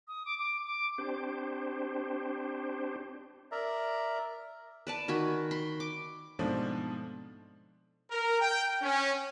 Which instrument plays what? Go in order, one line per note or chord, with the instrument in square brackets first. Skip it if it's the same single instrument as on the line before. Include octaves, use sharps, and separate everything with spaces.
[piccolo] D#6
D6
D6
D6
[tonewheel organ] C4 D4 G4 C5
[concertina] A#4 D5 E5 A#5
[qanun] B4 D5 A5
D#3 F#4 G#5 B5
B5 C6
D6
[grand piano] G#2 B2 F3 A3 C4 D4
[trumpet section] A#4
G5
C#4